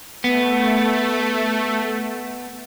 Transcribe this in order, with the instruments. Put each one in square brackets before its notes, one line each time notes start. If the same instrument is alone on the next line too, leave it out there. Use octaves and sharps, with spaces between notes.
[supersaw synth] A3 [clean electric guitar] B3